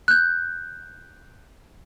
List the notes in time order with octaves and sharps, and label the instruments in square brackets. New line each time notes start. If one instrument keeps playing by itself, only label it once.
[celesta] F#6 G6